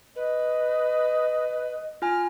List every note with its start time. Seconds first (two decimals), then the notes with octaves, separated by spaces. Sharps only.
0.16 B4 D#5
2.02 F4 G#5 F6